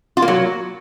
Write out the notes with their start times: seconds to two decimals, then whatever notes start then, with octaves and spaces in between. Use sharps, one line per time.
0.17 F4
0.22 A#3
0.28 F#3